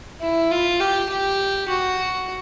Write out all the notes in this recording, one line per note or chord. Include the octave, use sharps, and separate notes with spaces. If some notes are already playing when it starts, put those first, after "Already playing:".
E4
F4
G4
G4
F#4